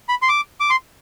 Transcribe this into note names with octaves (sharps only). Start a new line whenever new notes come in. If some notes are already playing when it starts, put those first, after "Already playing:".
B5
C6
D6
D6
C6